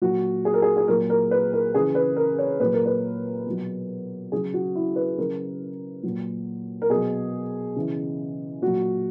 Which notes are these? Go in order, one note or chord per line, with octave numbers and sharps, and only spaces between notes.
A#2 F#3 F#4
G#4
A#4
G#4
G#4
A#2 F#3 A#4
A#4
B4
A#4
C#3 E3 G#4
B4
A#4
C#5
A#2 F#3 B4
A#4
B4
B2 F#3
C#3 F#3 G#4
F#4
E4
B4
C#3 F#3 A#4
A#2 F#3
A#4
B2 F#3 G#4
C#3 E3
A#2 F#3 F#4